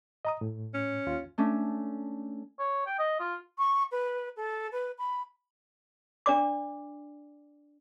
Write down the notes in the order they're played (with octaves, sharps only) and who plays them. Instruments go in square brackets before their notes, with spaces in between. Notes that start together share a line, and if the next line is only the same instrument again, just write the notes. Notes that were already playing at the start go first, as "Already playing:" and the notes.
[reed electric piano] D#5 A#5 D#6
A2
[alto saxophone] C#4
[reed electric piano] D#2 F4
[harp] A3 C#4 D4
[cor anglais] C#5
G5
D#5
F4
[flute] C#6
B4
A4
B4
B5
[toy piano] D4 D5 D6